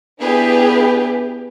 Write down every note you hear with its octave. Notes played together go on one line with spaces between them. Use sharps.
B3 D4 E4 G4 G#4 B4